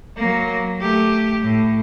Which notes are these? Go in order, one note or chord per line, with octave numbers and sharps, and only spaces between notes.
F#3 A#3
A3 G4
A2